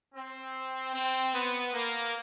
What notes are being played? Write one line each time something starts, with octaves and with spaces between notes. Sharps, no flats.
C4
C4
B3
A#3